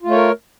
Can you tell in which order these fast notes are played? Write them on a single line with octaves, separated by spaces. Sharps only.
F4 A3 C#5 A#4